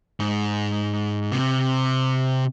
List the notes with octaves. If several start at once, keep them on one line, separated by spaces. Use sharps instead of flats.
G#2
C3